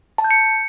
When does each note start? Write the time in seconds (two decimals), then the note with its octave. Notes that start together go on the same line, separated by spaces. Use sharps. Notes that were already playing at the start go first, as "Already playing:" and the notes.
0.18 A5
0.24 G6
0.31 C#7